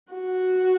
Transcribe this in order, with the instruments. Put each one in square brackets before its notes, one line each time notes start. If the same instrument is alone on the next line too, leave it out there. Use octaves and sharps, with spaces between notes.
[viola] F#4